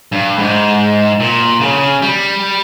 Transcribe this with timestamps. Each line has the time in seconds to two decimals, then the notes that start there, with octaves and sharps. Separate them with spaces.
0.12 G2
0.39 G#2
1.20 A#2
1.61 C#3
2.02 G3